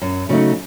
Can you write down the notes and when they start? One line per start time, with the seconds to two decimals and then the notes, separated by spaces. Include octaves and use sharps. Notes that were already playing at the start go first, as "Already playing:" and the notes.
0.02 F#2
0.29 C#3 F#3 A3 D#4